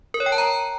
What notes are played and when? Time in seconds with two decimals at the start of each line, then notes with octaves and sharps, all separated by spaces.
0.14 A#4
0.20 C#5
0.26 G5
0.32 A5
0.38 A#5